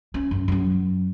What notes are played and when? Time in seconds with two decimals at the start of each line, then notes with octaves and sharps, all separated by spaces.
0.14 C#4
0.31 F#2
0.48 F#2 F#3